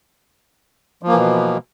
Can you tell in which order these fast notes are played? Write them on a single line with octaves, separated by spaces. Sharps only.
F3 A#3 E3 B2